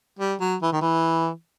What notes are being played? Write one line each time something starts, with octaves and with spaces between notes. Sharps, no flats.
G3
F#3
E3
D#3
E3